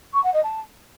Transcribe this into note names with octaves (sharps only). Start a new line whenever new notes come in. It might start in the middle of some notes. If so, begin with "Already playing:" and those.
C#6
F#5
D#5
A5